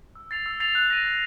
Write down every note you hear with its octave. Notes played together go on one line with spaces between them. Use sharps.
E6
A6 C7 F7
E6
A6 C7 F7
F#6
A#6 D#7
F#6